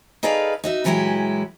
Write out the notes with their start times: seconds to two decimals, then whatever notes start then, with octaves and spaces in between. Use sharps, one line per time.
0.23 D#4 G#4 A4 B4 D5 F5
0.64 D#4 F#4 E5
0.84 A#2 E3 F#3 G#3 E4 G4